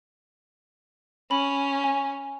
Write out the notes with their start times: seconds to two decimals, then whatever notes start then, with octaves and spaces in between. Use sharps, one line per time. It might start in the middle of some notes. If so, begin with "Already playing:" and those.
1.31 C#4 B5
1.84 G#5